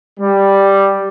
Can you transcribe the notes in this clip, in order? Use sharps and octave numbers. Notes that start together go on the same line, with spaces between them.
G3